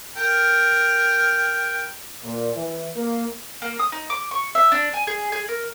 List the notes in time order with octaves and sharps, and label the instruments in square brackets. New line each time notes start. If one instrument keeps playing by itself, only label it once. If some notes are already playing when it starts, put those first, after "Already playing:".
[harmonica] A#4 G5
[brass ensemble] A#2
E3
A#3
[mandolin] A#3
D#6
D#4
D6
C#6
E5
D4
G#5
G#4
G#4
A#4